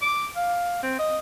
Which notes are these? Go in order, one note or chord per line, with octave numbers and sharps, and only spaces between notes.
D6
F5
C4
D#5